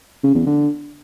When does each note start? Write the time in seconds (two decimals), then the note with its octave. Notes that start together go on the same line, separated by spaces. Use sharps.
0.24 C#3
0.35 E2
0.46 D3